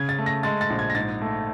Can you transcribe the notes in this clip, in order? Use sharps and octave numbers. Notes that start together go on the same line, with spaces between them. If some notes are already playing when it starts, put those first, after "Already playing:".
Already playing: C#3 G#6
A6
A3
A#6
G#3 A6
A6
A#1
G#6
A#6
G#2 A6
A3